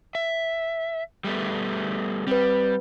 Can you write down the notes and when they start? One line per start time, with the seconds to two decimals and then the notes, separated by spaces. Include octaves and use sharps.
0.15 E5
1.24 G3 A3 B3
2.27 G3 C4 B4